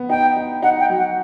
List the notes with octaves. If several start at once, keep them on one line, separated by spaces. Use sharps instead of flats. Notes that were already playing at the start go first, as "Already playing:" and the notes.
Already playing: B3
D#4 G5
D#4
D#4 F#5
G5
F#3
F#5